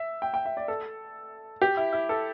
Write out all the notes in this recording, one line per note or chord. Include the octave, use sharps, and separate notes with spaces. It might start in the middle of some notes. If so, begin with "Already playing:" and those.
Already playing: E5
G5
G5
E5
D5
A4
G4
E4
E4
A4